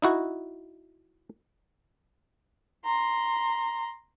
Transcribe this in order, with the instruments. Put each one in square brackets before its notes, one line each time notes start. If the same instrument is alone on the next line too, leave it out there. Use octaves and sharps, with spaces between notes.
[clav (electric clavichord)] D#4 E4 F#4
[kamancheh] A#5 C6